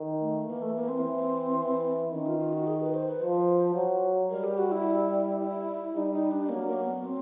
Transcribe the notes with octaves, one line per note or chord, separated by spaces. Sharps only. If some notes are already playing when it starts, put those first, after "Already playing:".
Already playing: D#3
A3
E3 A#3
A3
A#3
C4
E3
E3
D#3 C#4
F4
F4
F#4
G#4
B4
C5
B4
F3 C5
F#3
G3 A#4
G4
F#4
E4
E4
G3 D#4
D#4
D4
F#3 A#3
A#3
B3
C4